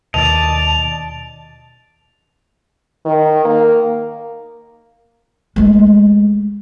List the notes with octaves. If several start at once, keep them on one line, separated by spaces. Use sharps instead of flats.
D#2 B2 D#3 D5 D#5 A5 F7
D#3
A#3
G#3 A3